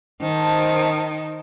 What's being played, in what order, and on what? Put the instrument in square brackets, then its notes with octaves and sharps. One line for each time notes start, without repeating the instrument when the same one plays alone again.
[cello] D#3 [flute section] A#4 C5 A5